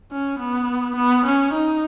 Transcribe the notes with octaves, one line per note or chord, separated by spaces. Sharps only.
C#4
B3
B3
C#4
D#4